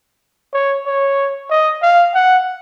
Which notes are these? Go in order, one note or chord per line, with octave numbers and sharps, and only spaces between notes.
C#5
C#5
D#5
F5
F#5